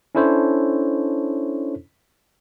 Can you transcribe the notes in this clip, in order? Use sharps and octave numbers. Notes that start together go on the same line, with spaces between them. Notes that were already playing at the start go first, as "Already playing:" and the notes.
C#4 D4 E4 A4 C5 C#5